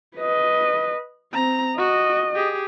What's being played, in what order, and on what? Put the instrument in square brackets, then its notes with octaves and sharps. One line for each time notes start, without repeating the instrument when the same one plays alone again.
[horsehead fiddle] B4 D#5
[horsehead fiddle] C4 [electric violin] A#5
[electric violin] F#4 [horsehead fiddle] D#5
[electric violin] G4 G#4